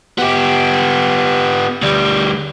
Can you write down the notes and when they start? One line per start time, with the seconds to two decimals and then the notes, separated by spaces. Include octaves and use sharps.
0.19 B3 G4
1.82 D2 G3